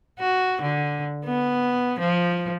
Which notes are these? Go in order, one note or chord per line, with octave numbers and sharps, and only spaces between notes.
F#4
D3
B3
F3